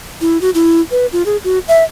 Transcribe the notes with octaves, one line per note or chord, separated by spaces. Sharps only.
E4
F#4
E4
B4
F4
G#4
F#4
E5